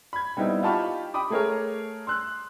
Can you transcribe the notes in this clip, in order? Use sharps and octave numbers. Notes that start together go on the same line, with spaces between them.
B5 G#6
G3 B3 C4 D#4 E4
D#4 F4 G4 A5 B5 C#6
G5 B5 D6 D#6
A3 G#4 A#4 C#5
C6 E6 F#6